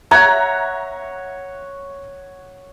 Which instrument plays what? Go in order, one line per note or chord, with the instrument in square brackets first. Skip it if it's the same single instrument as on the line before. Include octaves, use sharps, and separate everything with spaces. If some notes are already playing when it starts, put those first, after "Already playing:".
[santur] C#5 F#5 [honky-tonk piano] E5 A#5 F#6